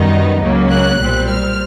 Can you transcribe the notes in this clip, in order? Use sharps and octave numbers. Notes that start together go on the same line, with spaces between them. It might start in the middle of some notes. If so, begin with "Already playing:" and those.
Already playing: F#2 D#3 G3 B3 D#4
C#2 C#3 F#3 A#3
F#6
B1 A#2 G3 C4
F6